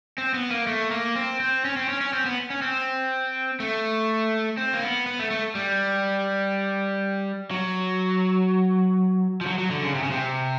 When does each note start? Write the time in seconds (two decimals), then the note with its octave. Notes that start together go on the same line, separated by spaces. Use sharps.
0.18 C4
0.34 B3
0.51 A#3
0.67 A3
0.91 A#3
1.16 C4
1.40 C4
1.65 C#4
1.77 C4
1.89 C#4
2.01 C#4
2.13 C4
2.26 B3
2.50 C#4
2.62 C4
3.60 A3
4.57 C4
4.73 A#3
4.82 B3
5.06 B3
5.19 A3
5.31 A3
5.55 G3
7.51 F#3
9.41 F3
9.46 F#3
9.58 F#3
9.71 D3
9.83 C#3
9.95 C3
10.03 C#3
10.11 C3